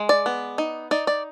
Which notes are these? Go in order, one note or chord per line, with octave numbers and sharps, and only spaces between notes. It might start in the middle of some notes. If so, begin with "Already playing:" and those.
Already playing: G#3
D5
B3
D#4
D#4 D5
D5